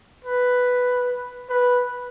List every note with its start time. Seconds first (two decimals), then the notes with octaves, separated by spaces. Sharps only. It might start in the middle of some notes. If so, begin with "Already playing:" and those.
0.25 B4
1.49 B4